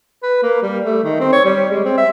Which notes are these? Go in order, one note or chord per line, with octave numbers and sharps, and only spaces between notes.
B4
A#3
G3
A3
D#3
C4
C#5
G3
G#3
C4
E5